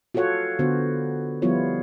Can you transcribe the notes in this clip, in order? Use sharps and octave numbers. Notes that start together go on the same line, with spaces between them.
F4 F#4 A4 C#5 F#5
D3 B3 F#4 C5
F3 G3 B3 E4 F4 C#5